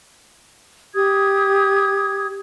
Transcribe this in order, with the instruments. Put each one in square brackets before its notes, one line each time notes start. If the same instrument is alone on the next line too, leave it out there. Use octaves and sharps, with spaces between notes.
[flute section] G4 D#6 G#6